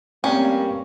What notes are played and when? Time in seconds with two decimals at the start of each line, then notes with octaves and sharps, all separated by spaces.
0.24 G2 G3 A3 A#3 C4 C#4 D5 G5